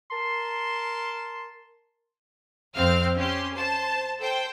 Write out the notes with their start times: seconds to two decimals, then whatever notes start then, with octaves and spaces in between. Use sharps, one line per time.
0.12 A#4 A5 C6
2.75 F2 C4 F5 F6
3.15 C#4 G4 C6
3.54 C5 A5
4.19 A4 C5 G5